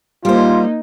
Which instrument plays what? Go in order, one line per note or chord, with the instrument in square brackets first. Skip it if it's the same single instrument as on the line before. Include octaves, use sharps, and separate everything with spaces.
[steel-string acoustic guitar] G3 C5 [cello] A#3 D#4 [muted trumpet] F4